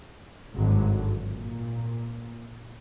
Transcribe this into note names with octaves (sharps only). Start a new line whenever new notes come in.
G#1 G2 D3 F#3
A#2